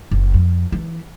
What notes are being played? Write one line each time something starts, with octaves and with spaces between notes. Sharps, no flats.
F#1
F2
E3